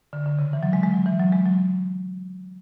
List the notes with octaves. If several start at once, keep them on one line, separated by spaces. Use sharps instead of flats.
D3
D3
C#3
E3
F#3
G#3
G#3
F#3
E3
F#3
G#3
F#3